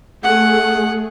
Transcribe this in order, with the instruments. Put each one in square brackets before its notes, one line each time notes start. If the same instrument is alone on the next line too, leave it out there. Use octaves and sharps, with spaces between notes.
[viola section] A3 G#4 [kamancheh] F#5